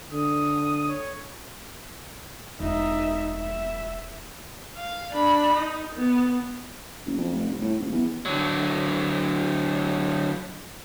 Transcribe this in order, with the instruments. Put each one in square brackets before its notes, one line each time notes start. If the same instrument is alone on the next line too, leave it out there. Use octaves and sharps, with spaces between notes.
[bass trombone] D3 [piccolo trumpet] D#6
[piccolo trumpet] C#5
[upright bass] E1 [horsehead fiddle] D#4 E5
[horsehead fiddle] E5
[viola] F5
D4 B5
D#4
B3
[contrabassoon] F#1
F2
F1
C2
A2
D#1
E2
[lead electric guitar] D3 F#3